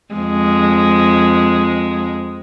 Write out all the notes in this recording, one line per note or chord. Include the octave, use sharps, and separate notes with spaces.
F2 G#3